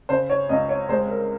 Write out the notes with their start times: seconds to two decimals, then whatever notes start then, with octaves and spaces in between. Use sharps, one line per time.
0.09 C#3 C5
0.29 C#5
0.49 C#2 D#5
0.69 C#5
0.89 G#3 C5
1.09 A#4